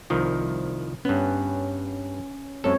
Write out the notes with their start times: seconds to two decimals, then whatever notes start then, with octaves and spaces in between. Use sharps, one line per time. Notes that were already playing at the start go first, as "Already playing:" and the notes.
0.10 C2 D#3 F3
1.05 G2 B3 C#4
2.64 F#2 G#3 C4 A4 C#5